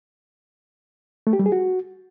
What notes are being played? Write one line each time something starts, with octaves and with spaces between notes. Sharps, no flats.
A3
G4
G3
G#4
F#4